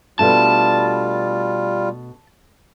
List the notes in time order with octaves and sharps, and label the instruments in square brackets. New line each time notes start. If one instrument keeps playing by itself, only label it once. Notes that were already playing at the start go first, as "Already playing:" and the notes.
[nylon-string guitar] B2 A3 D4 [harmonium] G3 F4 [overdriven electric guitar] A5